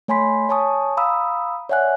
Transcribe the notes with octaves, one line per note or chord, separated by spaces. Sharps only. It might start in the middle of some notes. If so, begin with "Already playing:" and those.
A3 C#5 G#5 B5 C6 B6
C#5 G#5 A5 C#6 D#6
F5 A#5 B5 D#6 E6
C#5 D5 E5 F#5 G#5 F#6